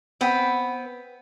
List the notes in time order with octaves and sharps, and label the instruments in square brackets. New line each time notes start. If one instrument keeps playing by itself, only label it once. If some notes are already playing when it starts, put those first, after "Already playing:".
[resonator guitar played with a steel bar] B3 C4